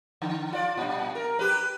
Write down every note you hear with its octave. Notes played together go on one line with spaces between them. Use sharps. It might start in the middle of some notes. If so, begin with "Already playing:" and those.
D3
F4 D5
G2 A#2
A#4
G4 B4